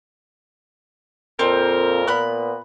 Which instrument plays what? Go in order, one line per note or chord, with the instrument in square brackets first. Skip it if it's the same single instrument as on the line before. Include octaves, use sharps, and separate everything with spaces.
[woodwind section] F2 A#2 [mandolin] C4 [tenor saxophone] A#4
[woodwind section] A#2 B3 [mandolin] B5 F#6